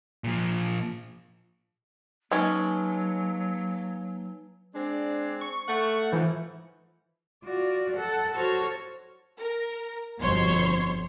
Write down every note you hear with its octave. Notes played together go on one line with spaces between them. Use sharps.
A#2 F3
F#3 G#3 A#3 C#4 D#4 B4 G#5
G#3 C4 D4
C#6
A3 F#5
G#2 E3 F3
F4 F#4 D5
A4 F#5
F#4 A4 C5 C#5 C#6 F6
A#4
G1 F2 B2 C5 C#5 C6